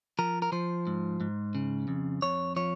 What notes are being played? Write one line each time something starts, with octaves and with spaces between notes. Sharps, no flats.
F3 A#4
A#4
F3 C5
G#2
G#2
C#3
F2
F2 C#5
F3 C#5